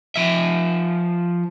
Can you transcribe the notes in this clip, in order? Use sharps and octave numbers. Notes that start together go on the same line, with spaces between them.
F3 E5